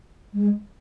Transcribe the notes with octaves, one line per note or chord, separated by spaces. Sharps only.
G#3